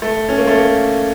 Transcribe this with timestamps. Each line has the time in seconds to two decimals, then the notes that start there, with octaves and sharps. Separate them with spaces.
0.02 A3
0.29 C#4
0.38 A#3
0.47 A3
0.57 A#3